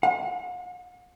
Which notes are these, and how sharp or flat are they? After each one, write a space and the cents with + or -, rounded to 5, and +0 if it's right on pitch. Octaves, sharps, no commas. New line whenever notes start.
F#5 -45